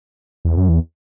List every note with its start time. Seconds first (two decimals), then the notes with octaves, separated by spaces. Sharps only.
0.45 E2
0.57 F#2
0.69 E2